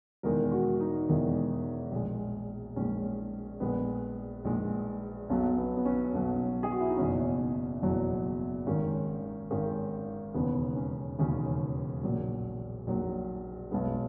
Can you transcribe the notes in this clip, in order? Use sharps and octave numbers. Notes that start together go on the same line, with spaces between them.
E1 E2 D#3 G#3 A#4
F#4
D#4
E1 E2 D#3 G#3
A#1 A#2 G#3
A#1 A#2 G#3 C#4
A#1 A#2 G#3 B3
A#1 A#2 G#3
B1 B2 F#3 C#4
B3
B3
C#4
B1 B2 F#3
G#4
F#4
E4
D#4
F#1 E2 B2 F#3 C#4
F#1 E2 B2 F#3
G#1 G#2 D#3 C#4
G#1 G#2 D#3 C#4
E1 D#2 C#3 B3
C#4
E1 D#2 C#3 C#4
A#1 A#2 F#3
A#1 A#2 F#3
B1 B2 G#3 B3